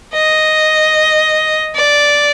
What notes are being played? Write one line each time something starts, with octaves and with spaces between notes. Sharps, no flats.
D#5
D5